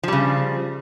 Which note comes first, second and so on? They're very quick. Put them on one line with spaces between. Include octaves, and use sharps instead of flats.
F3 G3 C#3